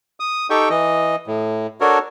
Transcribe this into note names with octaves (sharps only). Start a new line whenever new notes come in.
D#6
D#4 G4 A4 G5 C#6
E3 D#5
A2
D4 F#4 A4 A#4 C#5